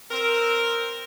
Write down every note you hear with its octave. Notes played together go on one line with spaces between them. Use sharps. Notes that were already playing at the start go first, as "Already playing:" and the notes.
C4 A#4